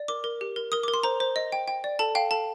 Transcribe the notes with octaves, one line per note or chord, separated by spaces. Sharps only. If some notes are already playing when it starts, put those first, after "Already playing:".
Already playing: D5
A#4 D6
A#4
G4
A#4
A#4 D#6
D6
A#4
C6
C5 A#5
C5
D#5
G5
G5
D5
A4 A5
F5 G5
A4 A5